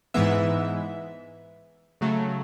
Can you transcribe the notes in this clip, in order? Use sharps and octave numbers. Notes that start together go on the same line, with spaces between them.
G#2 E3 G#3 B3 E5
C#3 F#3 A3